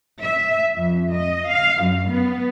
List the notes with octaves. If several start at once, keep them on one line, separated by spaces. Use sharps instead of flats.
E5
F2
D#5
F5
F#2
B3